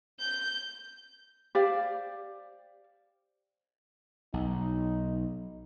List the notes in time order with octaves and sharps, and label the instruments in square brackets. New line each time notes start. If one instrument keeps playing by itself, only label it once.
[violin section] G6
[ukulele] G4 C5 D5 F5
[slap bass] B1 [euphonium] D#4